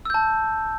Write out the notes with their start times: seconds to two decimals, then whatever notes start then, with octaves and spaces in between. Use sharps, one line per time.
0.05 E6
0.10 G6
0.14 A5